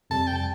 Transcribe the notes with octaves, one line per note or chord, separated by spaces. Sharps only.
F2 C3 G3 A5
G5
A5